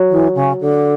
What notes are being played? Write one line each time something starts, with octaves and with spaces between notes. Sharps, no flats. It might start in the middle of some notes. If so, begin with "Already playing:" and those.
Already playing: F#3
E3
C#3
D3